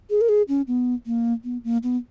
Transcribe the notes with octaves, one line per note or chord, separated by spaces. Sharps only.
G#4
A#4
G#4
C#4
B3
A#3
B3
A#3
B3